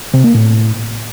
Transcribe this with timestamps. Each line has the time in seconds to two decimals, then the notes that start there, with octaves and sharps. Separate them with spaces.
0.14 C3
0.24 A#3
0.34 A2